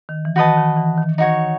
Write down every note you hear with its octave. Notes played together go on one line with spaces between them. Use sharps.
D#3
E3
D#3 F#4 B4 D#5 A5
D#3
E3
D#3
D#4 F#4 C#5